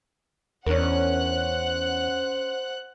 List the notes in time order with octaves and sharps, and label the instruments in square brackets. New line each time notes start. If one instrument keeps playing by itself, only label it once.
[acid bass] E2 [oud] C#4 D4 A#4 [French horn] C5 [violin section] F#5 F#6